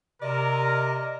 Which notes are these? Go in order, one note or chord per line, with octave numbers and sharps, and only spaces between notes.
C3 A#4 D5 D#5